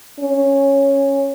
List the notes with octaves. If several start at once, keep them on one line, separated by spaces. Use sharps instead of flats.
C#4